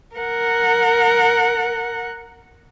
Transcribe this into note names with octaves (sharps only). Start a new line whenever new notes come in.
A#4 F#5